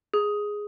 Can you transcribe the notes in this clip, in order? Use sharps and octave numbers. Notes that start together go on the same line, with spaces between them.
G#4